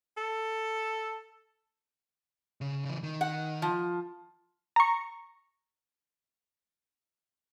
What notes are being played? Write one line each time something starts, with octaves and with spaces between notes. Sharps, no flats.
A4
C#3
C#3 E3
D#3
F#5
F3
A#5 C#6